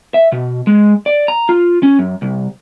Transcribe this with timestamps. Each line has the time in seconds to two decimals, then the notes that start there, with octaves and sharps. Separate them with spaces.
0.14 E5
0.32 B2
0.67 G#3
1.06 D5
1.28 A#5
1.49 F4
1.83 C#4
1.99 F#2
2.22 C2